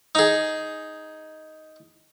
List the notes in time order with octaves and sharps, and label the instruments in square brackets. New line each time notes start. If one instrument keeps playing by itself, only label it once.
[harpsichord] D#4 G#4